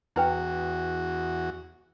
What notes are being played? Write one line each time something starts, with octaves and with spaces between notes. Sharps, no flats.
E2 E4 F#4 B4 G5